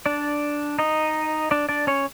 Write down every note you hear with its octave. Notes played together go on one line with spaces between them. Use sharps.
D4 D5
D#4 D#5
D4 D5
D4 D5
C#4 C#5